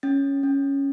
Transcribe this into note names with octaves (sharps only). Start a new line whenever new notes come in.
C#4 A6
C#4